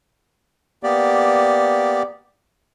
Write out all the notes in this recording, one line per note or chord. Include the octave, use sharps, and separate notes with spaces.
A#3 B3 G4 D5